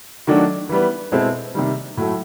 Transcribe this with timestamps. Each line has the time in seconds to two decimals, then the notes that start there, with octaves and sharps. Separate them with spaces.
0.27 D#3 F#3 A3 D4 F#4
0.69 E3 G3 B3
1.12 B2 G#3 C4 E4 A4
1.55 C3 D#3 G3
1.97 A2 F#3 A3